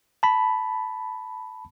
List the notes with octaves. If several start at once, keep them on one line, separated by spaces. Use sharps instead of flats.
A5 B5